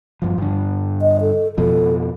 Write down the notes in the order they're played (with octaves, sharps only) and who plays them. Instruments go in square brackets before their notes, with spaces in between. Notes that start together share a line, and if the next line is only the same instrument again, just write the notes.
[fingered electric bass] G2 F3
G2 D3
[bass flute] D#5
A4
[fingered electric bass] F2 B2 F3 [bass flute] A4